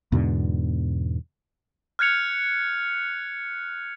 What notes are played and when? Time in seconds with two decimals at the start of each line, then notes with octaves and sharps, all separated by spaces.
0.12 E2 G#2 B2 D3
1.99 F6 F#6 G#6 C#7 F7